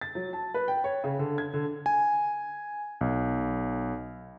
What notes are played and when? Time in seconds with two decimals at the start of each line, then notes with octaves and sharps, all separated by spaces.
0.01 A6
0.15 F#3
0.33 A5
0.54 B4
0.68 G5
0.84 C#5
1.04 C#3
1.19 D3
1.38 G#6
1.53 D3
1.86 G#5
3.01 B1